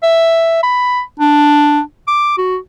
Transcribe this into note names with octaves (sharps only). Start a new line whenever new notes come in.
E5
B5
D4
D6
F#4